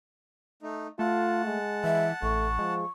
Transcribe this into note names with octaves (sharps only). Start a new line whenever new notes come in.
A3 D#4
A3 F4 F#5 A5
G#3
E3 E5
A1 A3 C#6
F3 G#3